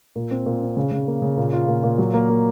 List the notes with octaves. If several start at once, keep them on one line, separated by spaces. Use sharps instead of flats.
A#2
C4
A#2
C4
C#3
C#3
A#3
C#3
A#2
F4
A#2
A#2
F#3
A#3
A#3